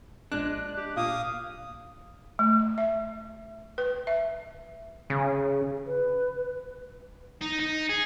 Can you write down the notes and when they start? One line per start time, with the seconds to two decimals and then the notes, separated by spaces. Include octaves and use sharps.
0.32 A#1 G#3 D4 F#6
0.77 G4
0.97 A#2 A#3 F5 D#6
2.39 A3
2.78 E5
3.78 B4
4.07 E5
5.10 C#3
5.85 B4
7.42 D#4
7.60 D#4
7.89 G#4